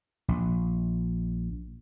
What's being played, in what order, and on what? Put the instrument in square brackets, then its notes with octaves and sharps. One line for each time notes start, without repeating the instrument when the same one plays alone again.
[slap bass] A#1